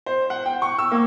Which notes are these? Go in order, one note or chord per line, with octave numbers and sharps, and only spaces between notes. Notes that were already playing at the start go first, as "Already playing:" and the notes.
C5
F#5
G5
C#6
E6
A#3